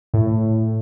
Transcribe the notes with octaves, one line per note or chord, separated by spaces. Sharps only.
A2